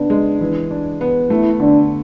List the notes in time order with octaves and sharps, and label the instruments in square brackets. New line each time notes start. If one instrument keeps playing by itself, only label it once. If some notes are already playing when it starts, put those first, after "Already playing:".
Already playing: [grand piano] C#3 B3 [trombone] D4
[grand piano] G#3
E3
D4
B3
[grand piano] A3 [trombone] E4
[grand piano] D3 [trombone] D4